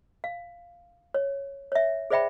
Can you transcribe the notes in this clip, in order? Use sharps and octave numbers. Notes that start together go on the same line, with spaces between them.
F5
C#5
C#5 E5
G#4 C5 D5 E5 G5 B5